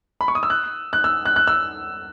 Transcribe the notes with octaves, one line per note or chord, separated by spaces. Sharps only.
B5
C#6
D#6
E6
F#6
F#6
E6
F#6
F#6
E6